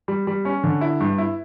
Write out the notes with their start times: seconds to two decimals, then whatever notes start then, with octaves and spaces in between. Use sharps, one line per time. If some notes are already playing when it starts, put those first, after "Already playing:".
0.08 G3
0.27 G3
0.45 C#4
0.64 D3
0.81 E4
1.00 G2
1.18 E4